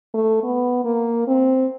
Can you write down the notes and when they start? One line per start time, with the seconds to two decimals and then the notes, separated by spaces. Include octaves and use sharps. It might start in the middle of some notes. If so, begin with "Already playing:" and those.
0.14 A3
0.43 B3
0.85 A#3
1.27 C4